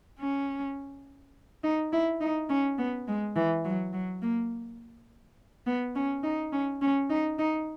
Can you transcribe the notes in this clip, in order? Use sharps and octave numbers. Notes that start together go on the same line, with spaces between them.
C#4
D#4
E4
D#4
C#4
B3
G#3
E3
F#3
F#3
A#3
B3
C#4
D#4
C#4
C#4
D#4
D#4